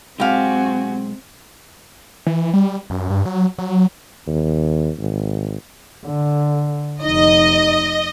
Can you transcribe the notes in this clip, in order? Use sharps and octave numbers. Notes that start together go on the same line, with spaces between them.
B1 G#3 C4 F#4 G4 F5 G#5
E3
G3
F#2
G2
F#3
F#3
D#2
G#1
D3
F1 D#4 D#5